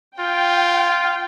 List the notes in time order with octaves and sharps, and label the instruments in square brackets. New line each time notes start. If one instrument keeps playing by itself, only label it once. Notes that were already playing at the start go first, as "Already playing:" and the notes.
[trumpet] F4 [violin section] G5